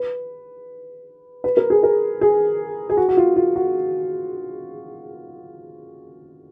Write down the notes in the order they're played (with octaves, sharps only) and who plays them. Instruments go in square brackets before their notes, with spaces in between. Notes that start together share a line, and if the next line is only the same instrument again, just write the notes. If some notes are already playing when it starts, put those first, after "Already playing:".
Already playing: [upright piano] B4
B4
A#4
G#4
A#4
G#4
G#4
F#4
F#4
F4
F4
F#4